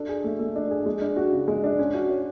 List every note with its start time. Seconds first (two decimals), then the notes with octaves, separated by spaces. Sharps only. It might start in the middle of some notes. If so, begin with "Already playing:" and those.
Already playing: D4 A4
0.09 G#4
0.24 A3
0.39 A3
0.56 D4
0.71 G#4
0.86 G#3
1.02 D4
1.16 F#4
1.32 C#3
1.48 G#3
1.64 D4
1.79 C#4
1.94 F#4
2.09 C#5